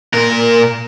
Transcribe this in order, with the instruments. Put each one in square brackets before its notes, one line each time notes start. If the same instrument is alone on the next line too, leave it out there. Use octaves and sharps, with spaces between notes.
[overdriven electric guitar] A#2 A#4